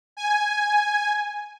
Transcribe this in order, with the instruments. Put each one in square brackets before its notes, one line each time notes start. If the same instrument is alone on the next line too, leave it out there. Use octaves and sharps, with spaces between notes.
[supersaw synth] G#5